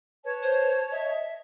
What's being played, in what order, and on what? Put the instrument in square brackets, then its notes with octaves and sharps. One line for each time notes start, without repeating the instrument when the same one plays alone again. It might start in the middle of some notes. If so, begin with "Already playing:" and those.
[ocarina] B4 [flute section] C#5 A5
[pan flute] C5
[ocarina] D#5 [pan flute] E5